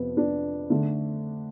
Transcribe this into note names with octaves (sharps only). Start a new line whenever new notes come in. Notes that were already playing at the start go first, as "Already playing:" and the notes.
Already playing: F2 C3 F3 B3
D4
D3 A3